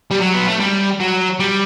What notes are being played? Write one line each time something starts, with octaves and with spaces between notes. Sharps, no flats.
G3
F#3
B3
A3
G3
F#3
G3